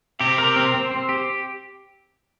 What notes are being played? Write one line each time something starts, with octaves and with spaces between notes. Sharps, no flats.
C3 G4
A#4
C4
C4
C4
G4